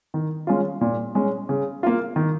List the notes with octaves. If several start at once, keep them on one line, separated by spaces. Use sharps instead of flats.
D#3
G#3 C#4 F4
A#2
G#3 C#4
C#3
A#3 F4
D#3